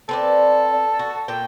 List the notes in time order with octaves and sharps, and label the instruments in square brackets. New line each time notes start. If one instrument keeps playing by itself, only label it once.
[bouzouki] C4 B4 D5 [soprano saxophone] A4
[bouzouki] F#4
A#2 G5